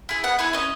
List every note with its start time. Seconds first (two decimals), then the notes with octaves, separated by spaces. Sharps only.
0.09 E4 G#4
0.24 B3 F#5
0.39 E4 G#4 E5
0.53 C#4 D#5